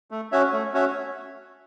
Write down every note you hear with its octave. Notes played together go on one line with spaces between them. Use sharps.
A3
C#4 F#4 C#5 E5
A3
C#4 F#4 C#5 E5